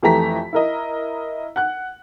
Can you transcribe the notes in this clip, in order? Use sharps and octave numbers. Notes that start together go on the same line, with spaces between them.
F2 E3 A3 G4 A#5 B6
E4 A#4 D#5
F#5 F#6